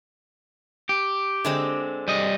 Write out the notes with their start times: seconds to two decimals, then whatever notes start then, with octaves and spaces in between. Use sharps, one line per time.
0.89 G4
1.45 D3 G#3 C4
2.08 G3 D#5